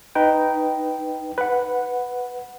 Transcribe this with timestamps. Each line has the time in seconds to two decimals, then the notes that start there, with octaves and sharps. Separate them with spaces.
0.15 D#4 B4 G5
1.38 B4 F#5